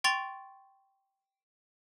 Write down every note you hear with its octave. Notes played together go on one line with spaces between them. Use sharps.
G5 C6 C#6 A6 F7